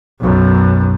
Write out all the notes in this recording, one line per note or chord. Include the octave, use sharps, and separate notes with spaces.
B1 F#2